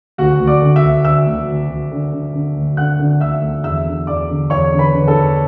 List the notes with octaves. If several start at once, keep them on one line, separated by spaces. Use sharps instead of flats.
D2 F#4 F#5
D2
D5 D6
D3
E5 E6
D2
D2 E5 E6
D2
D2
D2
D3
D3
D3
D2
D3 F#5 F#6
D3
D2 E5 E6
D2
E2 E5 E6
D3
E2 D5 D6
D3
E2 C#5 C#6
D3
B4 B5
D3
A4 A5
E2